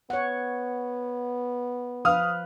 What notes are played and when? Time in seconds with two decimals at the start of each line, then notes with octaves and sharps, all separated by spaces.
0.10 B3 C#5 F#5
2.05 F3 B4 F5 D#6 F6